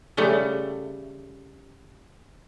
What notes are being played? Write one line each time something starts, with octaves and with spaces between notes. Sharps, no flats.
C#3 G3 A3